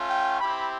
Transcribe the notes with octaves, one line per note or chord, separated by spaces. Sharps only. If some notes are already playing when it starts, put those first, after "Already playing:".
Already playing: A3 C#4 F4
G5
C4 E4 G4 B5